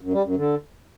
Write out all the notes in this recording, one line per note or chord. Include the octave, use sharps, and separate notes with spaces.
F#2
G3
F#2
D3